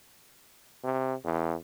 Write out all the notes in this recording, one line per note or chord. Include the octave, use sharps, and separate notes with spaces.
C3
E2